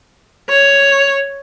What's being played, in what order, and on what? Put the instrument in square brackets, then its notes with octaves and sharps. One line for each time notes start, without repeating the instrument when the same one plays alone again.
[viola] C#5